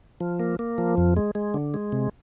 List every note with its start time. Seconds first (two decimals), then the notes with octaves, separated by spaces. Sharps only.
0.21 F3
0.40 A#3
0.59 A#3
0.78 F3
0.97 F2
1.17 G#3
1.35 G#3
1.54 D3
1.74 G#3
1.92 C3